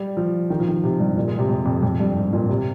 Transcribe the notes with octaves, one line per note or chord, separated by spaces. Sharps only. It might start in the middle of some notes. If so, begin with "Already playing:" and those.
Already playing: G3
F3
D#3
F3
D#3
C3
G2
A#2
G#3
C3
F2
F2
F2
G2
G#2
A#2
C3